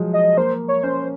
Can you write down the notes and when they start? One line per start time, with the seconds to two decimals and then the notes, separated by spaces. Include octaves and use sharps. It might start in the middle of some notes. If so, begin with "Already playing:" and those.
Already playing: F3 F#3 G#3
0.14 D#5
0.37 A#3 C5
0.68 C#5
0.83 C#4 C5